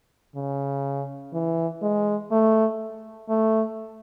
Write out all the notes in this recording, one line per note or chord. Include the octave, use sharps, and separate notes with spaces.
C#3
E3
G#3
A3
A3